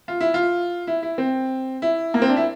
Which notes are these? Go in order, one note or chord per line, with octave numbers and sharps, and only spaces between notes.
F4
E4
F4
E4
E4
C4
E4
A#3
C4
D4
E4